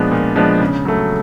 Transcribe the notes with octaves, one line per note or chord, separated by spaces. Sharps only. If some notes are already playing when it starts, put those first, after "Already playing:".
Already playing: A#2 F3 G#3 B3 D4
A#2
F3 G#3 B3 D4
C#3
F#3 A3